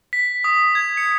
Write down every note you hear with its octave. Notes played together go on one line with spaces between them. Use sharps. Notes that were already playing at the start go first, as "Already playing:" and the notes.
B6
D#6
G#6
C#7